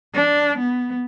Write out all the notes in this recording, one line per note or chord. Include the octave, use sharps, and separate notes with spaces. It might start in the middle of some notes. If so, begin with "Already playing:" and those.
D4
B3